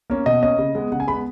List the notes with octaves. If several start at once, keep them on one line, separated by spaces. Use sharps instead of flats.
A#3 C#4
B2 D#5
A#3 C#4 D#5
C#3
G#3 B3
C#3 F#5
G#5
G#3 B3 B5